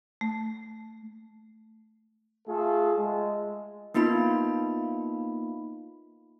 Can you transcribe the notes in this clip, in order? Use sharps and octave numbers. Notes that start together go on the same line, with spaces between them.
A3
A3 F4 G#4 A4
G#3
A#3 B3 D#4 F4 B5